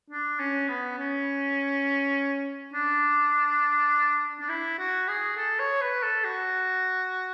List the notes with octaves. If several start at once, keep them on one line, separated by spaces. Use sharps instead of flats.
D4
C#4
B3
C#4
D4
D4
E4
F#4
G#4
A4
C#5
B4
A4
F#4